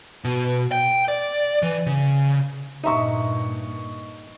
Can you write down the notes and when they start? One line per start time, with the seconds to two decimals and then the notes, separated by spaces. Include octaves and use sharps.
0.25 B2
0.72 G5
1.08 D5
1.63 E3
1.86 C#3
2.84 G2 A#2 D#4 D#5 E5 C#6